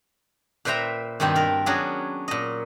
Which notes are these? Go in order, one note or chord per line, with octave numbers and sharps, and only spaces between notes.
A#2 B4 C5 E5 G5 A#5
G2 B2 D#3 G3 C4 G4
D4 A#4
F#3 B3 C#4 D4 F#4 G#4
A#2 D#5